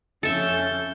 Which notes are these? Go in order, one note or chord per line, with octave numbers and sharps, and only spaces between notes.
F2 C#4 A4 E5 G6